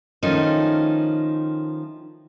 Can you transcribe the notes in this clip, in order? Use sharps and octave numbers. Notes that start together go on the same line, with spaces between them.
D#3 F3 A3 C#4 D#4